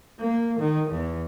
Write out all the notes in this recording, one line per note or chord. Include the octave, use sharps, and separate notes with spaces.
A#3
D#3
E2